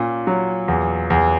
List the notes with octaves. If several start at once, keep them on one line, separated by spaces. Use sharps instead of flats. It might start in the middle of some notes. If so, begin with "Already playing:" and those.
Already playing: A#2 C#4
F#3
E2
E2